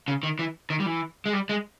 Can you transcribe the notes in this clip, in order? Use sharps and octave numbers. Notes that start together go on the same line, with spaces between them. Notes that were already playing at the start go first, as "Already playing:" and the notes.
C#3
D#3
E3
D#3
G3
E3
G#3
G3
G#3